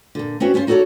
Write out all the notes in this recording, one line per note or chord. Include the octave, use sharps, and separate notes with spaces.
A#2 D3
C4 C#4 E4 F#4 B4
B3 C#4 F4 C5
D#4 F#4 A4 B4 C#5 D5